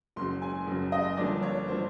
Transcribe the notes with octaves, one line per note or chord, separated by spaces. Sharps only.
F#1 F#2 C#3 C6
G#5
F#1 F#2 C#3
D#5
G1 G2 D3 F3 A#3 D5
C#5
D3 F3 A#3 C5